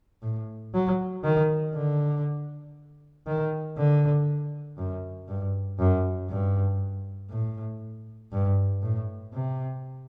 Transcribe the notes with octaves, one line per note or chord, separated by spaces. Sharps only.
A2
F#3
D#3
D3
D#3
D3
F#2
G2
F#2
G2
A2
G2
A2
C3